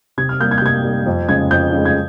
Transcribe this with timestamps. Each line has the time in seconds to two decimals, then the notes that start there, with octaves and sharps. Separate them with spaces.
0.18 C3 G#6
0.29 F6
0.40 G3 A#3 G6
0.51 G#6
0.58 G6
0.62 C3 G#6
0.84 G3 A#3
1.06 F2
1.28 C#3 G#3 G#6
1.51 F2 G6
1.72 C#3 G#3
1.85 G#6